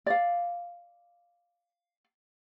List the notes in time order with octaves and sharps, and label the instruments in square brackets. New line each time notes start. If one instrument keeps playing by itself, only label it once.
[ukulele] D5 F5